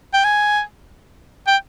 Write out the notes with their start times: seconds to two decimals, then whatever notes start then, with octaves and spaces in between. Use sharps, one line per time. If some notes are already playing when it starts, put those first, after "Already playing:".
0.14 G5
0.24 G#5
1.47 G5